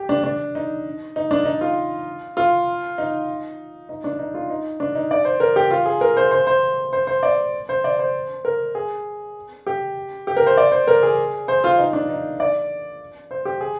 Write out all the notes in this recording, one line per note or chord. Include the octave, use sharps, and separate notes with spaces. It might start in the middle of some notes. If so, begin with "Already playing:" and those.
Already playing: G4
D4
D4
D#4
D#4
D4
D#4
F4
F4
D#4
D#4
D4
D#4
F4
D#4
D4
D#4
D5
C5
A#4
G4
F4
G#4
A#4
C5
C5
C5
C5
C5
D5
C5
D5
C5
A#4
G#4
G4
G4
A#4
C5
D5
C5
A#4
G#4
C5
F4
D#4
D4
D#4
D5
C5
G4
G#4